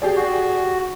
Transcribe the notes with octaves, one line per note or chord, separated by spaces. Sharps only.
G4 G#4 D5
F#4